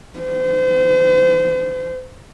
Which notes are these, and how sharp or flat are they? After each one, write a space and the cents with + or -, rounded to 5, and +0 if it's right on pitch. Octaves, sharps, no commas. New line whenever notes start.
C5 -35